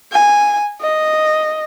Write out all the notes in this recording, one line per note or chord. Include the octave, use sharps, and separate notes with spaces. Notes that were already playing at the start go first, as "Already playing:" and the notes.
G#5
D#5